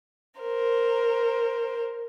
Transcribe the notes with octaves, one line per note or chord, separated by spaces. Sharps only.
A#4 C5